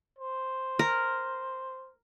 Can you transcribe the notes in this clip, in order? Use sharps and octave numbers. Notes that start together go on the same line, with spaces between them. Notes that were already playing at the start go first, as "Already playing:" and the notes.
C5
A#4